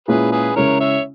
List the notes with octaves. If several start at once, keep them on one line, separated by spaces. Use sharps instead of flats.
A#2 G#3 C#4 E4 G#4 B4
G#4 B4
C#3 G#3 C#4 E4 A#4 C#5
C#5 E5